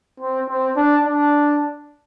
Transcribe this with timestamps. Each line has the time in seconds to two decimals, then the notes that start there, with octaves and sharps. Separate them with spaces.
0.20 C4
0.48 C4
0.77 D4
1.05 D4